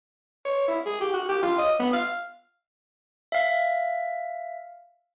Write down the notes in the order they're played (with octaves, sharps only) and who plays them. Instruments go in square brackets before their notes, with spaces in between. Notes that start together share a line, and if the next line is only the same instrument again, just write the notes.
[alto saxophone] C#5
E4
G#4
G4
F#4
G4
F4
D#5
B3
F5
[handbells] E5 F5